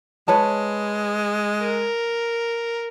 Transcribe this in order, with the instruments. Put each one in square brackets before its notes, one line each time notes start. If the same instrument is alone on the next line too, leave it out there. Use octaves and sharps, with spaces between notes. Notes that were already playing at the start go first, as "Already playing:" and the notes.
[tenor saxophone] G#3 [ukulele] B4 C#5 A5
[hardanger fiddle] A#4